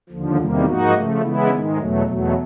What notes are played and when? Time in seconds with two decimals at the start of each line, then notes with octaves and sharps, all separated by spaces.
0.09 D#2 D3 F3
0.37 E2 C3 D#3 G3 A#3
0.66 G#2 F3 A#3 D#4 F#4
0.94 C#3 F3 A3
1.22 C#3 E3 G#3 B3 E4
1.50 G#2 D#3 G#3
1.77 E2 B2 F#3 A3
2.06 E2 B2 F#3 A3